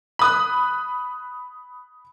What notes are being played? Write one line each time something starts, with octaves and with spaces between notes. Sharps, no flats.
B5 D#6 F#6